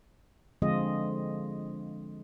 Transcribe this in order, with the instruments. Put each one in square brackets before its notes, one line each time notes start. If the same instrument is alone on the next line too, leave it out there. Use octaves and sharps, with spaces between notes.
[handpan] D3 F3 G#3 C4 F4 D#5